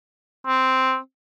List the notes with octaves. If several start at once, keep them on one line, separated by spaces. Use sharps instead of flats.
C4